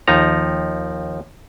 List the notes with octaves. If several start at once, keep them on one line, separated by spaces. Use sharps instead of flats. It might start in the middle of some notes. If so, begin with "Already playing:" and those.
D#2 F3 D#4 A#5